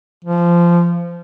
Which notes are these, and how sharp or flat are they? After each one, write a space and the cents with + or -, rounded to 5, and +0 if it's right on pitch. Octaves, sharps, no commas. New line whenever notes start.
F3 -20